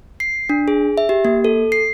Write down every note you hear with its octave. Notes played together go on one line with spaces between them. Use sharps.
C7
D4
G#4
E5
G4
A#3
A4
C7